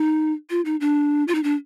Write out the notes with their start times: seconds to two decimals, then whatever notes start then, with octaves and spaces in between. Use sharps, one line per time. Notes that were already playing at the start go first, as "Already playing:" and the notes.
Already playing: D#4
0.50 F4
0.65 D#4
0.81 D4
1.28 F4
1.35 D#4
1.43 D4